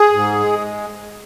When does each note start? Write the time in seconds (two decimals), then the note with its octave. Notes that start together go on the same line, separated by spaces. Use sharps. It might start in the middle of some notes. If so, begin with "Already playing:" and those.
Already playing: G#4
0.13 G#2
0.39 G#3